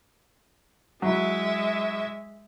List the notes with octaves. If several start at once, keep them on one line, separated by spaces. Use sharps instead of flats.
F#3 G#3 E4 E5